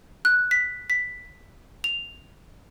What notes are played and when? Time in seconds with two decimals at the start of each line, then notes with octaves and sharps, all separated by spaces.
0.25 F#6
0.51 B6
0.90 B6
1.84 F7